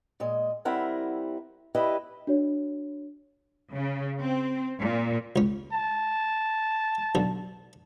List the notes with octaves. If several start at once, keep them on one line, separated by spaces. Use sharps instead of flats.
A#2 G#3 D#5
G3 C4 E4 A#4 F#5
E4 G4 B4 D5 D#5
D4 F#4 C#5
C#3
C4
A#2
C#2 C#4
A5
B1 D3